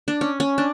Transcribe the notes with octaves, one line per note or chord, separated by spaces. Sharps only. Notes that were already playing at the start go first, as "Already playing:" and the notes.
D4
C#4
C#4
D4